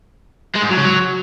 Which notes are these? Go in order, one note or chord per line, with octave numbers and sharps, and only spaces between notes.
G#3
G#2
F#3
C#3
F#3